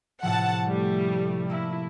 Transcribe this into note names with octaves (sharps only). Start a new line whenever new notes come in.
A2 C3 F3 F#5 A5
G3 A3
A3 A#3 E4